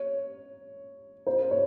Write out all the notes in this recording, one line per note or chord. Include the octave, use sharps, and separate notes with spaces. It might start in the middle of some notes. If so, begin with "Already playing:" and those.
Already playing: C#5
C5
C#5